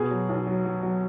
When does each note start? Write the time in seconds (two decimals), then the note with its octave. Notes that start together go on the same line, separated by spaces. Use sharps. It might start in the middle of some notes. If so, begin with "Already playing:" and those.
Already playing: B2 G#4
0.10 F#3
0.29 B1
0.47 F#3
0.65 F#3
0.83 F#3